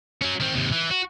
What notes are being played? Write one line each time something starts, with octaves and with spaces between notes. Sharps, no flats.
F#3 C#4
D#3 C4
D#2 C3
E3
F#4